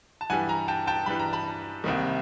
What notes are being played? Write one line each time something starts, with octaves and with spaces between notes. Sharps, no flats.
A5
G2 E3 G3 F#5 G#5
G#5 A#5
G5 A5
G5 A5
G2 E3 G3 B5
A#5
A5 B5
C2 C3 D#3 G3 A#3